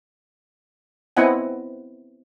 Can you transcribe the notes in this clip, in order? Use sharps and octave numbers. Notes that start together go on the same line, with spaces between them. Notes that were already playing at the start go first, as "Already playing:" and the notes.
B3 C4 E4 D#5 F#5 G#5